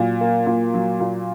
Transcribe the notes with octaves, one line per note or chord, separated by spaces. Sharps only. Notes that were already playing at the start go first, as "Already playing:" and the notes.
Already playing: A#2 F#3
A#3
A#2
F#3
A#2